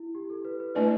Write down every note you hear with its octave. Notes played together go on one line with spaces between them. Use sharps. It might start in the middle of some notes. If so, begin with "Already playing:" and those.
Already playing: E4
G4
A4
B4
B4
A3 D4 E4 B4 D5